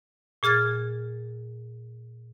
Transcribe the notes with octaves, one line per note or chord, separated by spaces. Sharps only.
A#2 G#4 F6 G#6 A6